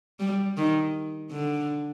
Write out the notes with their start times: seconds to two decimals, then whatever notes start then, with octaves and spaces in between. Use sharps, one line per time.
0.20 G3
0.57 D#3
1.31 D3